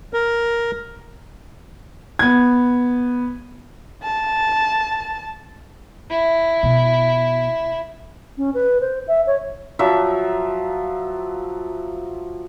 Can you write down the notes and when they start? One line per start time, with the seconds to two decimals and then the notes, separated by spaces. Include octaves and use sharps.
0.13 A#4
2.19 B3 G#6
4.03 A5
6.10 E4
6.63 B2
8.38 C#4
8.54 B4
8.81 C5
9.08 E5
9.27 C#5
9.79 F3 F#3 E5